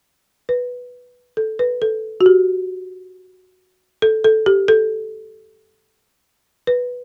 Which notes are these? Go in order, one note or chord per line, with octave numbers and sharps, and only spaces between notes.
B4
A4
B4
A4
F#4
G4
A4
A4
G4
A4
B4